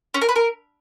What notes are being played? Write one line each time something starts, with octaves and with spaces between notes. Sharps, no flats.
C#4
A#4
B4
A#4